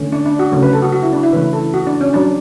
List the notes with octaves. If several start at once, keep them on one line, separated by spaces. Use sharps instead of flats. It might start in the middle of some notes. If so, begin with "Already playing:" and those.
Already playing: D3 A3 C#4
D4
D4
F#4
C#3 F#3 A3 C#4
B4
A4
F#4
F#4
E4
D4
E4
C#3 E3 A3 C#4 B4
A4
F#4
D4
C#4
F#3 C#4 D4